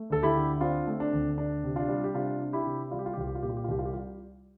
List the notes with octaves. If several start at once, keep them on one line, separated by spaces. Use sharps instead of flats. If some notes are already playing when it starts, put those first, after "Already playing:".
Already playing: A3
D2 A4
E4 G4
D3
C4 D4 F4
A3
D4
D2
D4
C3
D4 F4
G3
G4
C3 D4 F4
D4
E4 G4
C3
G3 F4
G4
F4
G4
C2 F4
G4
F4
A#2 G4
F4
G4
F4
C2 G4
F4
G4
G3 F4